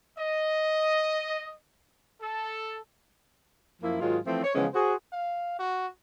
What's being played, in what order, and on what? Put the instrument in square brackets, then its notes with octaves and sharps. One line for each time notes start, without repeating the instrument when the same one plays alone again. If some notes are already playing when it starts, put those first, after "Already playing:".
[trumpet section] D#5
A4
[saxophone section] F#2 F3 A#3 E4
G#2 D#3 F#3 G#3 F4
E3 F3 A3 C4
C#5
C#3 E3 F3 G#3 B3 C#4
F#4 G#4 C5
[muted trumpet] F5
F#4